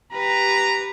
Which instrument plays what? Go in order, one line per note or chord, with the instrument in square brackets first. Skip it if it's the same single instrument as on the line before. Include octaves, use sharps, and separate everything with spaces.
[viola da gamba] G4 B4 [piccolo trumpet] A#5